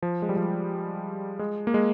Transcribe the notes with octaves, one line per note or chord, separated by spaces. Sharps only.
F3
G#3
G3
F3
G#3
A#3
G#3